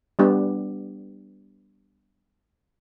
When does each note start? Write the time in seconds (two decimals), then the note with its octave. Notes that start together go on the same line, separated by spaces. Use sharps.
0.19 G3 B3 D4 G4